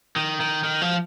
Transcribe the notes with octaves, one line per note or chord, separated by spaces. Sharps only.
D#3
D#3
D#3
F3